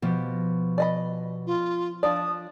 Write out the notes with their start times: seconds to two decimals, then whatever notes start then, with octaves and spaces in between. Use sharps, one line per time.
0.02 B2 F3 G4
0.78 D5 D#5 B5
1.46 F4
2.03 F3 D4 D5 D#6